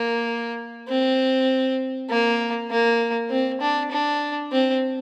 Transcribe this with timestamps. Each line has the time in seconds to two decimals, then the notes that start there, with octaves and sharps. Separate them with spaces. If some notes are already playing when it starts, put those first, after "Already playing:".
Already playing: A#3
0.88 C4
2.10 A#3
2.70 A#3
3.30 C4
3.61 D4
3.91 D4
4.52 C4